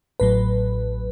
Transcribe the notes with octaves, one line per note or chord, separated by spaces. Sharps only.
A1 A2 F#3 B4